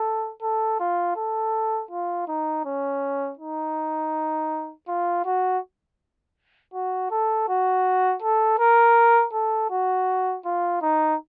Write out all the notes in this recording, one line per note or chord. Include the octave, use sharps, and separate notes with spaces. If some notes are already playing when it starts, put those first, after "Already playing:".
Already playing: A4
A4
F4
A4
F4
D#4
C#4
D#4
F4
F#4
F#4
A4
F#4
A4
A#4
A4
F#4
F4
D#4